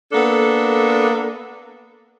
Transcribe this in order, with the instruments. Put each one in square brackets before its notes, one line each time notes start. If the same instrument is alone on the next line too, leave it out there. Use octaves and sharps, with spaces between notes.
[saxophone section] A#3 B3 D4 A4